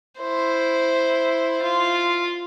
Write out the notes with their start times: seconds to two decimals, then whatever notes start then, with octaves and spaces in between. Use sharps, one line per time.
0.20 E4 C5
1.62 F4